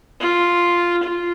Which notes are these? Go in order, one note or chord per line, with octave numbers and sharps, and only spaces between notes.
F4
F4